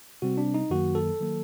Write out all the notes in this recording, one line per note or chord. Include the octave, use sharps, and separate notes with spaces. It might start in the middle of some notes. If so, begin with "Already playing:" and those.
C3 G3 C4 F#4
D4
D#4
F#2 D#3 F#3 A#3 F#4
A4
D#3 F#3 A#3